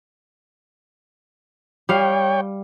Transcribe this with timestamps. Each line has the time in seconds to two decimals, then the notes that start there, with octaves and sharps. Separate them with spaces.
1.89 G3 C#5 F5 G5